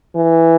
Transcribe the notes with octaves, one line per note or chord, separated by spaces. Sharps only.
E3